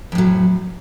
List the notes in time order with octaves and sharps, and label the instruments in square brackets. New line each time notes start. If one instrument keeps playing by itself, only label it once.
[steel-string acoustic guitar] F2
A2
F#3